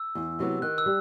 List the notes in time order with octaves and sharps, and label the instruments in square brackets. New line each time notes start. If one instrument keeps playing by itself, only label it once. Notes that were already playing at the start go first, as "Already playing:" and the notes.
Already playing: [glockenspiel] E6
[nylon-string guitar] E2
C3 F#3 B3
[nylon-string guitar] D#3 [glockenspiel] F#6
[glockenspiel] E6
[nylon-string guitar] G3